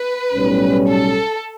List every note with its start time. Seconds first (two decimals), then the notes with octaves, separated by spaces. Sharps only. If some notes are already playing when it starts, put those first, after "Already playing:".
Already playing: B4
0.33 B1 A2 G3 C#4
0.89 A4